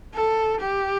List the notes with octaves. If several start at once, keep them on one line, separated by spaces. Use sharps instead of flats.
A4
G4